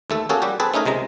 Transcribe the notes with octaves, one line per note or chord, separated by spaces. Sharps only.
D#2 A3 A4
A#3 C#4 F#4 G#4 A4
G3 F#4 G4
C4 G#4 A4 B4
A3 C#4 D#4 G#4 A#4
C#2 C3 G#3 A#5